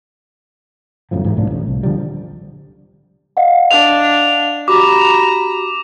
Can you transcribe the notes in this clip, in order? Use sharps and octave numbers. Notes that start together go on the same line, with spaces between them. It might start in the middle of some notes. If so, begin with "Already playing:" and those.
G1 F#2 A2 F3
G#2 E3 F3 A3
C2 A2 F3 D4
A1
C2
D#1 D3 F3 G3
D#5 F5 F#5
D4 F7
F#4 G4 A#5 B5 D6